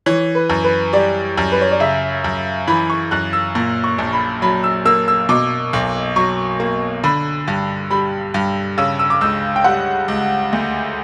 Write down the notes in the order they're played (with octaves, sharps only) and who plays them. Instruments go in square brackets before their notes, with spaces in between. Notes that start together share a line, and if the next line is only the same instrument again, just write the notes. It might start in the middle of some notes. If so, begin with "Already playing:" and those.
[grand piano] E3 [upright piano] C#5
[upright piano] B4
[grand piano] F#2
[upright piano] B4
[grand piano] G3 [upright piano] D5
[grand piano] F#2
[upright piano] B4
C#5
D5
[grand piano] C#3 [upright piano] E5
[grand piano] F#2
[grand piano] E3 [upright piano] B5
[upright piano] C#6
[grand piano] F#2 [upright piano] F#6
[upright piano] E6
[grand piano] A#2
[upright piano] C#6
[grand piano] A#1
[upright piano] B5
[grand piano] F#3 [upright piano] B5
[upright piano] E6
[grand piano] A#3 [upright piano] E6
[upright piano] E6
[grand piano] B2 [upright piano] D6
[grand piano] B1
[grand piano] F#3 [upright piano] C#6
[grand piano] A#3
[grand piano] D3 [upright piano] B5
[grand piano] G2
[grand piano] G3 [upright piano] B5
[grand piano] G2
[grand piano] C#3 [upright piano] E6
[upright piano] E6
D6
[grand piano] C#2 [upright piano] E6
[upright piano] G5
[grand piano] G3 [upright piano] F#5
[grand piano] C#2
D2